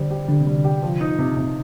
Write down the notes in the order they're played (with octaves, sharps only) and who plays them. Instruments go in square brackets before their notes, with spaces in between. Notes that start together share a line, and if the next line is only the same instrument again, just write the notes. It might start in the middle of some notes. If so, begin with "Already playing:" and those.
Already playing: [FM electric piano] D3 [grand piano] G3 C5
[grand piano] G4
[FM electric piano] D3 [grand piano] G3
[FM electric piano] C3
[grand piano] G3
[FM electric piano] D3
[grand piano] G4
F3
D#4
C3
C3